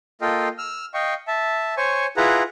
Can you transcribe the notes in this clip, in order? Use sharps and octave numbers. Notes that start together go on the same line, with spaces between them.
A#3 F4 A4 D#5 F5 G5
E6 F6
D#5 F5 G5 C#6
E5 A5
C5 C#5 G#5 C#6
E4 F4 G#4 B4 F#5 A#5